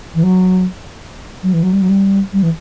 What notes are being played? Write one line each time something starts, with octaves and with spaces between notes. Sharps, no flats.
E3
F#3
F#3
E3
F#3
G3
F#3
G3
G3
E3